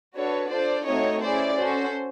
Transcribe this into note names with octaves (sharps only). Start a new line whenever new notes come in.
D4 F#4 A4 B4 C#5
D4 F4 A4 C5 D5
A3 C4 D#4 F#4 C#5 D#5
C#4 E4 G#4 C5 D5
C#4 F#4 A4 C5